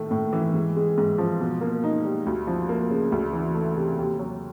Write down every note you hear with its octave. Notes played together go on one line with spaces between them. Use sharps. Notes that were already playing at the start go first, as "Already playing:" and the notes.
Already playing: A2 D#3 A3
A2
E3
G#2
G#3
G#2
F3
B2
A#3
D#4
G3
D2
F3
A#3
C#3
D2
E3
A3
C3
D#2
F#3